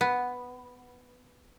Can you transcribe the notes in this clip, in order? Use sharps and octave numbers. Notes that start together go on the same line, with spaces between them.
B3